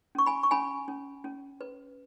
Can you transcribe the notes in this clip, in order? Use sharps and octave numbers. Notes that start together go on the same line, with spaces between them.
C#4 C#6
G#5 B5
C#6
C#4 G#5 B5
C#4
C#4
B4